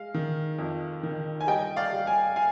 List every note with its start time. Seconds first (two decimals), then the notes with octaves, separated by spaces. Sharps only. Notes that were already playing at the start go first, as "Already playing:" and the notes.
Already playing: G#3 F5
0.14 D#3
0.59 F2
1.03 D#3
1.41 G#5
1.47 G3 D#5 G5
1.76 D5 F5
1.92 G3
2.06 F5 G#5
2.36 F5 G#5